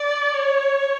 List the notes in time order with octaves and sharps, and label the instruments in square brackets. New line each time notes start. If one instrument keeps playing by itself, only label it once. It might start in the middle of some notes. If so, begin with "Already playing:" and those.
Already playing: [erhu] D5
C#5